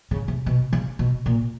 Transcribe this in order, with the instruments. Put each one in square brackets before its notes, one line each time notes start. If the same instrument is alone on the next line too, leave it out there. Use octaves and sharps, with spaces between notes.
[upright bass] C#3
C3
B2
C#3
B2
A#2